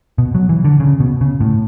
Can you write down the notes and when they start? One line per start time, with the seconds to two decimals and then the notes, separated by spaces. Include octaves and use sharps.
0.18 B2
0.35 F#3
0.49 E3
0.64 D3
0.80 C#3
1.00 B2
1.21 C#3
1.41 A2